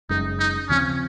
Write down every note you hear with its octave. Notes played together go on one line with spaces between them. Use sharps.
F#1 F#2 C#3 G#3 D#4
D#4
D#2 C#3 F3 C4 C#4